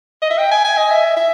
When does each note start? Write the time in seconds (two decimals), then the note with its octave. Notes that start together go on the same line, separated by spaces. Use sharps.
0.22 D#5
0.30 E5
0.38 G5
0.51 G#5
0.65 G#5
0.77 D#5
0.90 E5
1.16 E5